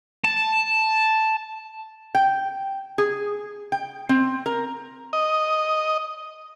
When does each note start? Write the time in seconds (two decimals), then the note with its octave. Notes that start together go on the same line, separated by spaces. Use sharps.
0.24 A5
2.15 G5
2.98 G#4
3.72 G5
4.09 C4
4.46 A#4
5.13 D#5